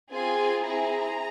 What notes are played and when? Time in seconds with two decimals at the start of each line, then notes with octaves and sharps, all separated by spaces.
0.12 C4 F4 G#4 G#5
0.66 C4 E4 G#4 A#5